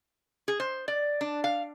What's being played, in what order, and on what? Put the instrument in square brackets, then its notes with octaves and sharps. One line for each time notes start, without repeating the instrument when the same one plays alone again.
[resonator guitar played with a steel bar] G#4
C5
D5
D4
F5